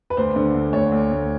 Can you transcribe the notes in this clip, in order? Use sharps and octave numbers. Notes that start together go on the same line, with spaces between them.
B4
D2 C5
D3
D2
D2 C#5
D2
D2